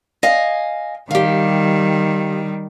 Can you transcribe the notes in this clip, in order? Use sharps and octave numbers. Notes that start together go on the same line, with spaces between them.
D#5 F5 G#5
D#3 G3 G4 F5